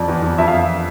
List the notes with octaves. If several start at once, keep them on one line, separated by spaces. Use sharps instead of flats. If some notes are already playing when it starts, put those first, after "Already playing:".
Already playing: F2 D5
E2
E2
F2 E5
F5
F2